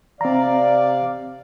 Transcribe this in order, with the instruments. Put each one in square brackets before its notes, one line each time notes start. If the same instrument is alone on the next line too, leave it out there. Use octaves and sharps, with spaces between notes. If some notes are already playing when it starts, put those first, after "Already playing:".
[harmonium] C3 D5 F5 [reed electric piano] C4 A#5